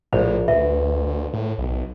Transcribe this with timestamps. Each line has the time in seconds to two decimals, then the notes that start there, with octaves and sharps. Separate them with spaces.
0.13 A#1 A2 C5
0.48 D2 B4 E5
1.06 D2
1.33 A2
1.58 B1